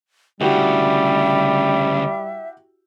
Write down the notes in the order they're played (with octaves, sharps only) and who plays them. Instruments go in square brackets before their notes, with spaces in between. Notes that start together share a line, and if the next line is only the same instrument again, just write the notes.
[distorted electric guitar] D2 C#3 [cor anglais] G3 [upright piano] E4 F#4 G4 [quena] E5